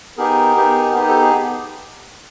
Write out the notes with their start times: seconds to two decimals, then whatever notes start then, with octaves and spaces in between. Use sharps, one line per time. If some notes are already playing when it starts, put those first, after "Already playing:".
0.17 B3 D#4 G4 G#4 A#4
0.57 B3 D#4 G4
0.95 B3 D#4 G4
1.08 A4
1.21 G#4